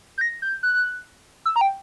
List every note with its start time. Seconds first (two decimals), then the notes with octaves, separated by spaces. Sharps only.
0.18 G6
0.21 A#6
0.42 G6
0.63 F#6
1.45 E6
1.56 A#5
1.61 G5